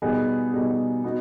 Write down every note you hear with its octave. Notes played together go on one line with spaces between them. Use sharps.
B2 G3 B3 D#4 G#4
B2 G3 B3 D#4 G#4
B3 D#4 F#4